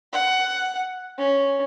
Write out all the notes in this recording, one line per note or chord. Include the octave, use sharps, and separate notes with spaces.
F#5
C#4